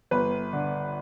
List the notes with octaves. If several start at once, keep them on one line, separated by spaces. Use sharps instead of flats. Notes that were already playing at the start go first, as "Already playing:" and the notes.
G1 B4
D3